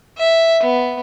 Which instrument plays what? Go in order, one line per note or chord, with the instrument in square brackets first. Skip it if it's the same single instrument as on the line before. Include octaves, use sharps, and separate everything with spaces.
[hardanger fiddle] E5
B3